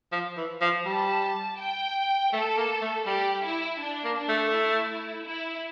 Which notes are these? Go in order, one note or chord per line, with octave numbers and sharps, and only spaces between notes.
F3
E3
F3
G3 A5
G5
A3 A4
A#3
A3
G3 G4
E4
D4
A#3
D4
A3
E4
E4